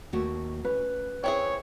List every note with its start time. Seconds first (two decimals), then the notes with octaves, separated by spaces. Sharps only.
0.13 D#2 A3 F#4
0.65 C#4 B4
1.24 C4 E4 G#4 C#5